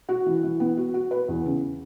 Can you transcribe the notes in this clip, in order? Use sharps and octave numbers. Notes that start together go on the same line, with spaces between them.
F#4
E3
E3
B3
F#4
F#4
B4
E2
C#3